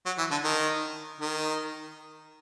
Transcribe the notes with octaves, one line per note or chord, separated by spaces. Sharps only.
F#3
E3
D3
D#3
D#3